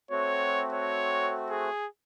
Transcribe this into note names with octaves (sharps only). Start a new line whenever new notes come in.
A3 C4 F#4 C#5
C#5
G#4